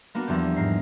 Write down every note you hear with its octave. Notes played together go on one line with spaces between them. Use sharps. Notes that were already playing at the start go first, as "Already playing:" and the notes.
A#3 B3 D4 F#4
E2 F3 G3 G4
G#2 A#4 C7